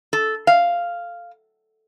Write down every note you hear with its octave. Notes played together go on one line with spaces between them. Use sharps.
A4
F5